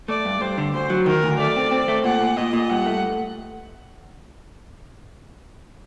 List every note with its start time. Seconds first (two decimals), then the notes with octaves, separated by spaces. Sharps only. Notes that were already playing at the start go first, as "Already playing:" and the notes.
0.08 A3 D5
0.25 G2
0.41 G2 C5
0.58 D3
0.74 D2 C5
0.90 F#3
1.06 D#3 A#4
1.23 D2
1.39 A3 D5
1.56 C4
1.71 C4
1.88 A3
2.04 A#2 F#5
2.21 A#2
2.37 A#2 D#5
2.53 A#2
2.70 G2 F#5
2.86 A3